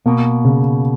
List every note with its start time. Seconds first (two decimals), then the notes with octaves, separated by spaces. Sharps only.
0.06 B2 A#3
0.45 C#3